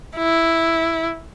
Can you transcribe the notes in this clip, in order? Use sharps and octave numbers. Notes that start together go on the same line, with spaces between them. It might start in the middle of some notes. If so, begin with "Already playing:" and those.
E4